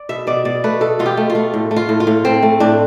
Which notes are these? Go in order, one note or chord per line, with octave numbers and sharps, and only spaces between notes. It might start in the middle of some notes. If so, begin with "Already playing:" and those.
Already playing: D5
B2 E5
B2 D5
B2 D5
A3 B4
B2 A4
B2 F4
G4
A3
F4
A3
A2
A3
F4
A2
F4
A2
A2 C4
A3
A2 D4